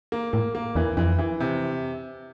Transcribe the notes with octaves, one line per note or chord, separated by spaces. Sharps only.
A#3
A2 A#3
A#3
E2 E3
F2 E3
E3
C3